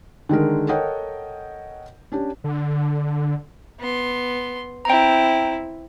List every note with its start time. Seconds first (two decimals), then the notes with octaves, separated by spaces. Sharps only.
0.29 D3 D#3 G#3 A#4
0.68 A4 A#4 C#5 D#5 F#5 G5
2.12 C#4 D4 G4
2.44 D3
3.80 B3 C6
4.85 C4 E4 G5 A#5